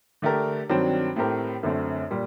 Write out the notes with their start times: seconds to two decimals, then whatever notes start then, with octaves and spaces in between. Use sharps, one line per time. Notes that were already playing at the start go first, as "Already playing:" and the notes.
0.22 D3 A3 D4 G4 A#4
0.69 G2 D#3 F#3 C4
1.16 A2 A3 C4 G4 A#4
1.63 F#2 D3 A3 C4
2.11 A#2 G3